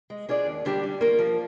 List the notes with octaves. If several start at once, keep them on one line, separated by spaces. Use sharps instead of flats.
G#3
D4 F4 G#4 D5
D#2
D3 G3 D4 G4
G3
A#3 F4 A#4
F3